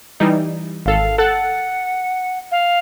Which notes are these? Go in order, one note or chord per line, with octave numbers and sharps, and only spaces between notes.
E3 G3 D#4
G#1 A4 F5
A4 F#5 F#6 A6
F5